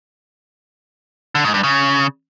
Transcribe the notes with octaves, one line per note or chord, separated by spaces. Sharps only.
D3
G#2
G2
C#3